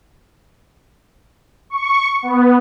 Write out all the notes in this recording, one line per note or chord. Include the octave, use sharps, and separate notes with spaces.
C#6
B3